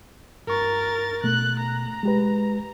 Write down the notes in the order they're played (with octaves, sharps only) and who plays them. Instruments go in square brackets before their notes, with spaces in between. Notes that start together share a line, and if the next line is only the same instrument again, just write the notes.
[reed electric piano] G2 C#6 [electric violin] A#4 A6
[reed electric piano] B2 A3 [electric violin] F#6
[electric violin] A#5
[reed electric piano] G#3 G4 B4